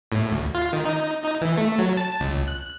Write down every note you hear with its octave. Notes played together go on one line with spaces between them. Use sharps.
A2
D2
F4
D#3
D#4
D#4
E3
A3
F#3
A5
C#2
F#6